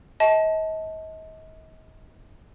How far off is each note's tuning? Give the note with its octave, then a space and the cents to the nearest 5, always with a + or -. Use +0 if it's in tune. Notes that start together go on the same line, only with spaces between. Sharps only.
D#5 +35 A5 -10